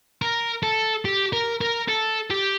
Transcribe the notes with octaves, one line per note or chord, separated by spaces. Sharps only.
A#4
A4
G4
A#4
A#4
A4
G4